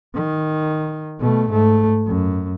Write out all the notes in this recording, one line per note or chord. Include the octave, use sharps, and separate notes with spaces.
D#3
B2 A3
G#2 A3
F#2